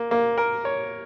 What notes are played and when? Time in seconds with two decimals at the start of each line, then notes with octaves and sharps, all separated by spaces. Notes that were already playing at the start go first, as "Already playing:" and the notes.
Already playing: A#3
0.11 A#3
0.38 A#4
0.65 C#5